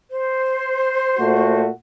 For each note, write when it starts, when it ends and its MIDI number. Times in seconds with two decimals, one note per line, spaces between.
0.11 1.60 72
1.18 1.68 46
1.18 1.68 57
1.18 1.68 66